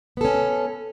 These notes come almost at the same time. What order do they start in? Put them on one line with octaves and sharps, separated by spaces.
B3 A4 C#4